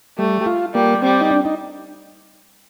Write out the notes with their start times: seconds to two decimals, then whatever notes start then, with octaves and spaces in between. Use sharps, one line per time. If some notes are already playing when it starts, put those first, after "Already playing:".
0.18 G3 A3
0.41 G4
0.46 F4
0.74 G3 A#3
1.02 G3 C4
1.21 D#4
1.31 D4
1.45 D#4